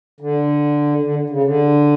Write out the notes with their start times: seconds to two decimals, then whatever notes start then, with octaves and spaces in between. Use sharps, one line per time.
0.21 D3
1.03 D3
1.30 C#3
1.43 D3